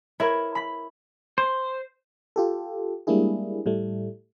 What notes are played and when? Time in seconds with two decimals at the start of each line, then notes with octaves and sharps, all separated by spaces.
0.20 E4 A#4 C#5 B5
0.55 B5 B6
1.38 C5
2.36 F4 G4 A4
3.07 G3 G#3 A#3 D4 E4 G#4
3.66 A2 G3 A3